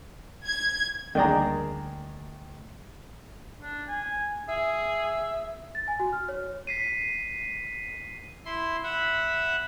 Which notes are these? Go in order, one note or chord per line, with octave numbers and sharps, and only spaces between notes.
G#6
D2 D#3 G3 A#3 D4 G#4 G5 A#5
D4
G#5
G#4 E5
A6
G#5
F#4
F6
C#5
B6 C7 D#7
E4 C6
E5 F#5 B5